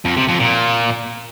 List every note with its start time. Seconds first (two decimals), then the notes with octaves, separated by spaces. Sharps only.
0.05 F2
0.17 C3
0.29 F2
0.40 A#2